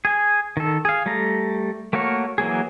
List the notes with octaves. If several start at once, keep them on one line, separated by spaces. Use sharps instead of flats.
G#4 G#5
D#3 A4
G#4 F5
G3 A3 A4 A#5
A3 A#3 F#4 A#4 C#5
E3 F#3 A#3 G#4